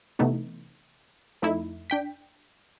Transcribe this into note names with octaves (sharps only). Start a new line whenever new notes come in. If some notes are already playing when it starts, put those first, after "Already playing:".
C3 E3 A3 B3 D#4
F2 A3 D#4 E4
D4 G5 B6